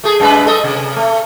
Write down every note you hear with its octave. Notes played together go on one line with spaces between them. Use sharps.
A3 G#4
F#2 G#3 B4
A3 A4 D#5
C3
A3